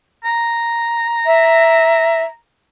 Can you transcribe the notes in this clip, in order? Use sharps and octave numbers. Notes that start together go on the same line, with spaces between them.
A#5
E5